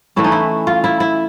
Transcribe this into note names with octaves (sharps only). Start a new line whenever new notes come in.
E3 A3 C#4 E4
D#4
E4
F4
E4
E4